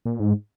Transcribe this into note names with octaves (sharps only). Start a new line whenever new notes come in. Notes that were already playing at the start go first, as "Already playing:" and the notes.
A#2
G#2